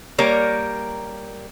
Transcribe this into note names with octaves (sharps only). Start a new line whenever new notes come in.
G3 A#3 A#4 C#5